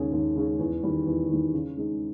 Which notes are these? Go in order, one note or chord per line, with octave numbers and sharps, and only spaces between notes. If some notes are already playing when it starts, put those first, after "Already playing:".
Already playing: D#2 C#3 G#3 C#4 G#4
D#2
C#3 G#3 C#4 G#4
E2
D#3 G3
E2
D#3 G3
C#3
G#3 D#4